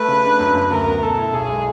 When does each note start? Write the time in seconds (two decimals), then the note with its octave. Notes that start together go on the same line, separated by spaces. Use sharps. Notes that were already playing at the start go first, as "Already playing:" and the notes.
Already playing: A3 B4
0.08 C#3
0.25 D4
0.39 F#2
0.55 F#2
0.71 D2 A#4
0.86 B3
1.02 B2 A4
1.18 E4
1.33 B1 G#4
1.49 G#3